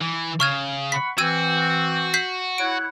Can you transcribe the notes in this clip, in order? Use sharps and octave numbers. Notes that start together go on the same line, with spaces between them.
E3
C#3 C#6 F6 G#6
F#5 B5 C#6 B6
E3 C4 F#4 E6 G#6 D#7
G6 B6 C7
E4 C#5 F#5 D7